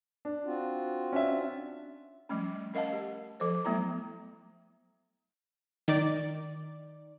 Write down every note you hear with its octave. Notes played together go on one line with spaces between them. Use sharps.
D4
C4 F4 F#4
C#4 D4 E5
F3 G3 A3 C#4
C#4 A#4 D#5 F5 F#5 A5
G4
F3 A4 C5
F#3 A3 B3 E4 A#5
D#3 D5